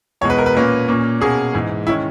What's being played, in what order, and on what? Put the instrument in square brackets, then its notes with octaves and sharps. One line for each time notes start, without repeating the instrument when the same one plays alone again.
[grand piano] E2 B2 G#3 C#5
B4
A#4
B4
A#2 A#3 C#4
A#2 A#3 C#4
B2 A#3 C#4 G#4
G#2 E3 G#3
D#3 G#3 C#4 E4